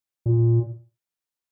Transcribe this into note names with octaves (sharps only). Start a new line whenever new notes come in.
A#2